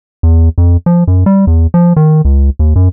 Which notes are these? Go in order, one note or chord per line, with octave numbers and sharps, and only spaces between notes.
E2
F2
F3
F#2
G3
E2
F3
D#3
C#2
D#2
F#2